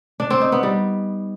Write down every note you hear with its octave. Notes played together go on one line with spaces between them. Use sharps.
D4
C4
D#4
B3
G3